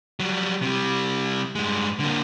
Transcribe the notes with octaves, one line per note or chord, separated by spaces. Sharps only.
F#3 G3
C3 G3
G2 G#3
D3 A#3